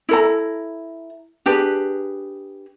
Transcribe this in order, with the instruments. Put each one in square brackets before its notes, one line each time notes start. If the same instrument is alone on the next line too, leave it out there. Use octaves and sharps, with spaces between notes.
[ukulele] E4 A4 A#5
D4 G4 G#4 B4